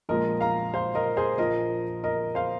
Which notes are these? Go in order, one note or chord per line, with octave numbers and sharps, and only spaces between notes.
A#1 A#2 F3 G#3 A#4 D#5
F5 A#5
C5 F5
A#4 D#5
G#4 C5
A#1 A#2 F3 A#4 D#5
A#4 D#5
C5 F5